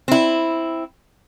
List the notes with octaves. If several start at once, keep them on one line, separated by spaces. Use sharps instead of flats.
C4 E4